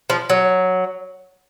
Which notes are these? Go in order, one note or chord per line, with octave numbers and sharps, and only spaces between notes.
F3
F#3